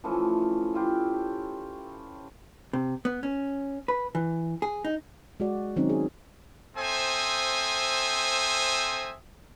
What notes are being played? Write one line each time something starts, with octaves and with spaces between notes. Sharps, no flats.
E3 F3 A3 C#4
E4 F4 G4
C3
B3
C#4
B4
E3
G#4
D#4
G#3 F#4 D5
D#3 F#3 C4 C#4 D#4
G#4
C4 A4 C5 E5 G#5 D#6